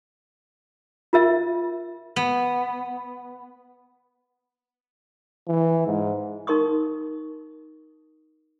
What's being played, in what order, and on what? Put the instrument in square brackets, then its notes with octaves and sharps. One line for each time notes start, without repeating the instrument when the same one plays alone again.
[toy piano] F4 A#4 E5
[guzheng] B3
[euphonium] E3
G#2
[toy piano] D#4 A#4 C6 C#6 D#6